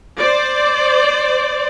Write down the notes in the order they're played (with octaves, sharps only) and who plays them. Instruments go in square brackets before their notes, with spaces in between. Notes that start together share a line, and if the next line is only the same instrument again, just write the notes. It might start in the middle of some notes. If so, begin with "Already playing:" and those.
[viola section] C5 D5